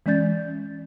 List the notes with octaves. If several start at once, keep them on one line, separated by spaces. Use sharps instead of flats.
E3 G#3 C#4 D5 G6 A6